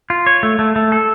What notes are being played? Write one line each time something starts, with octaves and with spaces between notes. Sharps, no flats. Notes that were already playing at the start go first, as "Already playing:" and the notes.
F4
C#5
A3
A3
A3
A4